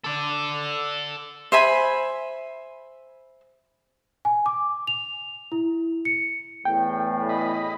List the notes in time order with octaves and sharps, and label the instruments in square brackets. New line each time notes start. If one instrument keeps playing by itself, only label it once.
[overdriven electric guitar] A4 D5
[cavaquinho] C5 E5 G#5 B5
[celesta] G#5
D6
F7
E4
C#7
[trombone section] E2 A2 [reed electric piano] G5
[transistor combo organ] D#5 B5